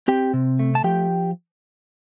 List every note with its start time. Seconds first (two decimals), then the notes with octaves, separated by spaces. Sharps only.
0.08 C4 G4 G5
0.34 C3
0.59 A3
0.75 A5
0.84 F3 G4 G5